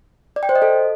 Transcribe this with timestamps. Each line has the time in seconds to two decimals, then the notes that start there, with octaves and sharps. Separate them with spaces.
0.36 D5
0.43 G5
0.49 C5
0.55 D#5
0.62 A4